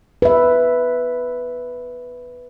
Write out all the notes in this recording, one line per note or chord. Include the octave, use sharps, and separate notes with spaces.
B4 E5